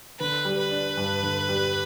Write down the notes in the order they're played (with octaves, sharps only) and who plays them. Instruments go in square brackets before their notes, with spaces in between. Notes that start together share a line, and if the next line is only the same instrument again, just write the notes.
[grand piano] D3 [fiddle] B4
[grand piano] G3
[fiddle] B4
[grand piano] D4
G2
D3
G3